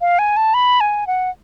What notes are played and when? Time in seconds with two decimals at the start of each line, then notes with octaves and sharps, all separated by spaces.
0.01 F5
0.19 G#5
0.37 A5
0.54 B5
0.81 G#5
1.07 F#5